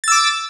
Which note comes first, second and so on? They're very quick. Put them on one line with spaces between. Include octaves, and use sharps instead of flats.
A6 E6 D6